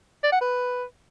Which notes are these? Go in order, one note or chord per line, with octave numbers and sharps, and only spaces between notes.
D5
F#5
B4